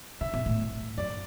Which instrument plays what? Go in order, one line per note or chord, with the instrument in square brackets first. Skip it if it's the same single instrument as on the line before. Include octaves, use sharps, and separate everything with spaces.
[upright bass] C3 [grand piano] E5
[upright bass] B2
A2
[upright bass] F#2 [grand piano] D5